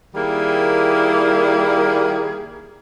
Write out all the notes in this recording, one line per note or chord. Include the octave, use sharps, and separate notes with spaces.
D#3 G3 A#3 E4 G#4